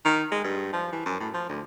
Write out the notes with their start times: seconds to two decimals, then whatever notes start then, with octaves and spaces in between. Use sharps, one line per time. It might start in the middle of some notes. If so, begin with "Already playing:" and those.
0.05 D#3
0.31 G#3
0.44 G2
0.73 F3
0.92 E3
1.06 F#2
1.20 A2
1.34 F3
1.49 D2